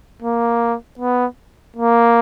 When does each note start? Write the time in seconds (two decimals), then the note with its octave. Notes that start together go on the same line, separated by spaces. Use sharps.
0.22 A#3
0.99 B3
1.76 A#3